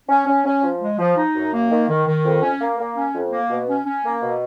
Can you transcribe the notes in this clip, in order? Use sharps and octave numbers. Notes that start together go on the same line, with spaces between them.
C#4
C#4
C#4
F3
G#3
F3
D#4
F#2
A#3
D#3
D#3
D#3
F2
C#4
A#3
A#3
C#4
F2
A#3
B2
C#4
C#4
A#3
B2